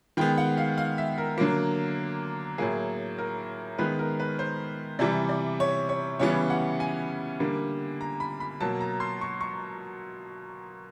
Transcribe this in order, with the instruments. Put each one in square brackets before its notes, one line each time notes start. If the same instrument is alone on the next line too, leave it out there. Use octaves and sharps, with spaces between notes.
[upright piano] D#3 G#3 B3 G5
F#5
F5
F5
E5
A#4
D3 F#3 A#3
A2 F#3 A#3 G#4
A#4
D#3 G#3 B3 B4
A#4
B4
C5
C3 E3 G3 D5
D5
C#5
C#5
C#3 E3 G3 B3 C#5
F#5
G#5
D3 G3 A#3
A#5
B5
B5
B2 F#3 A#3 A5
A#5
C6
C#6
C#6